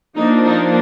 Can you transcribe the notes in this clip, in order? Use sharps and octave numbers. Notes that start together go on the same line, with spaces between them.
F3 A#3 D4 D#4
D#4